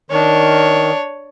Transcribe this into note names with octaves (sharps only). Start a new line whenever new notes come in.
D#3 D4 C#5